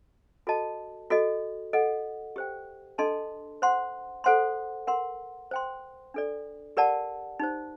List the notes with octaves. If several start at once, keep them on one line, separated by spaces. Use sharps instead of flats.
F#4 A4 D#5 A5
F#4 A4 D#5
A4 D#5 F#5
G4 C5 G5
D4 A4 D#5 A5 C6
C5 F#5 C6
A4 C5 F#5 C6
A#4 F#5 C6
C5 G5 C6
D4 A4 D5
G4 A#4 D5 F#5 A5
D#4 G4 C5